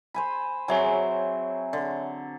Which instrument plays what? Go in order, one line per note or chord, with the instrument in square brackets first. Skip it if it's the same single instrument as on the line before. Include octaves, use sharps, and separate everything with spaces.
[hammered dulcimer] C5 G#5 B5
[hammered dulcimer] F#3 C4 G#4 [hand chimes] C#5 E5 G#5
[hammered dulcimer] D3